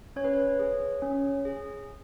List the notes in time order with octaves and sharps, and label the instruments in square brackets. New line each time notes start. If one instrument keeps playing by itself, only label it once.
[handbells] C#4 C#5
B4
C#5
G#4
C#4
G#4